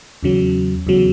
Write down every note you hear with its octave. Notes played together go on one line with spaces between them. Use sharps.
E2 C#3 F#3
E2 C#3 F#3